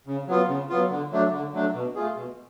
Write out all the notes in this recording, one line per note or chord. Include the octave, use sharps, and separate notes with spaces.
C#3
F#3 B3 F4
C#3
F#3 B3 F4
D3
F#3 A3 D4
D3
F#3 A3 D4
B2
A3 F4 G#4
B2